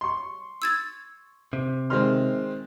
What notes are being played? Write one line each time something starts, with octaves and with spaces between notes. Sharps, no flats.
C6 C#6
E6 G#6 A6
C3
D#3 G#3 C4 C6 F6